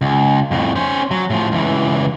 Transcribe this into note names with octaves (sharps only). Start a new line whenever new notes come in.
C#2
F2 A2
C#4 C5
F#3
A2 F3
C#2 E3